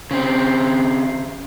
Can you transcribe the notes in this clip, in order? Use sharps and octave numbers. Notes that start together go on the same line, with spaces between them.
C#3 C4